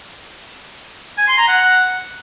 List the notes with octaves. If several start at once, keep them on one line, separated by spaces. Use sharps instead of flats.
G#5
C6
A#5
F#5